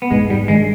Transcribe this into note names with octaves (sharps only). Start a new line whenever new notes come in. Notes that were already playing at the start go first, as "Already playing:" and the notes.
B3
G#2 G#3
G3
D#3 G3 G#3 D4